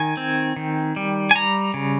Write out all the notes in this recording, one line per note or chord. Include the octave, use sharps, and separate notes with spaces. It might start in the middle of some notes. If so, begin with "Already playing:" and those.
Already playing: D#3 G#5
C4
D#3
G3
G#5
G3 A#5
C#3